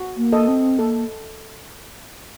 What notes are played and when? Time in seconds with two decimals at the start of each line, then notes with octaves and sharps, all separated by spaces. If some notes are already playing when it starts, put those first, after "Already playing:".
Already playing: F#4
0.17 A#3
0.32 A4 D#5
0.48 C4
0.79 A#3 A4